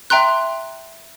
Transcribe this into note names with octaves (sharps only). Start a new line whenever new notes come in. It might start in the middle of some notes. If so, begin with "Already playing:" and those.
E5 G5 A#5 C6 F#6